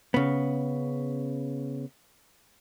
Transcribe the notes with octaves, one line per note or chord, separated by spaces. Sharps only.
C#3 B3